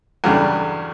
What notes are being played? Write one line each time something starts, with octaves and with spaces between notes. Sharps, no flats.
E2 G2 C#3 F#3 G3 A3